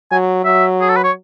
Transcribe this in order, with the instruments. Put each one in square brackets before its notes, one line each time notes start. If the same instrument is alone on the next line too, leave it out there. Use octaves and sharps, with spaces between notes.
[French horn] F#3 [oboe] G#5
[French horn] F#3 [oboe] E5
[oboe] G#4
A4
B4
C#5